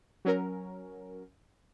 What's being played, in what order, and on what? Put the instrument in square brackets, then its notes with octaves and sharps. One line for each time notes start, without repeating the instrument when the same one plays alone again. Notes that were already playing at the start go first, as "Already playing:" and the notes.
[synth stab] F#3 C#4 A#4